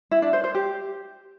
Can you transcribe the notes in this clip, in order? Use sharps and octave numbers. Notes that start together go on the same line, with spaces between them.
E4
D4
C5
C5
G4